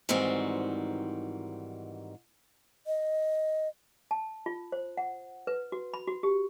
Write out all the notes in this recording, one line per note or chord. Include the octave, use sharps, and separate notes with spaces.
G#2 D#3 E3 G3 C4 F#4
D#5
A5
F4
C5
F#5
B4
F#4
B5
F#4
G4